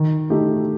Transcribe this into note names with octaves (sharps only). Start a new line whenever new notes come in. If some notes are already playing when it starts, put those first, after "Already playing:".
Already playing: D#3
A3 D#4 G4